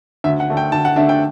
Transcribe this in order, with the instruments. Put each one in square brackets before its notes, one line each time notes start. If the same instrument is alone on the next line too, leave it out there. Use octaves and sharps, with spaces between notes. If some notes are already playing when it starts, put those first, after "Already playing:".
[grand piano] D2 E5
F#5
D3 A3 D4
G5
D2 A5
F#5
D3 A3 D4 E5
G5